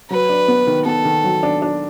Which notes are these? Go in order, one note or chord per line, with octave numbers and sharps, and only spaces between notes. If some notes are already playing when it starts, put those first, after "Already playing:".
F#3 B4
D4
B3
D#3
B3 A4
D#3
F#3
D4
D4